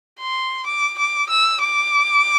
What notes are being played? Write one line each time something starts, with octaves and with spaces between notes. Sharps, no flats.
C6
D6
D6
E6
D6